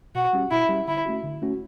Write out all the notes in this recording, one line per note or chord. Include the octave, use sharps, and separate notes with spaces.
B2 F#4
G3 C#4 G4
B2 E4
G3 C#4 G4
D3 E4
A3 C#4 F#4
D3
A3 C#4 F#4